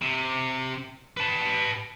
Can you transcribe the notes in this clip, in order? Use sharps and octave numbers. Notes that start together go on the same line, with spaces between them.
C3
B4 A5